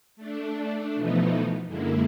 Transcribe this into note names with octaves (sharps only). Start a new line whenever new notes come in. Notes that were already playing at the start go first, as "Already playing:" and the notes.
A3 D4
B2 E3 F3 A3 B3 D#4
F#2 D3 G#3 A#3 E4